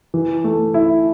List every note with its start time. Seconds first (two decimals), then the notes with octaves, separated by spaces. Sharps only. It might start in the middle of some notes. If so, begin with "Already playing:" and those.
0.14 E3
0.44 A3
0.74 E4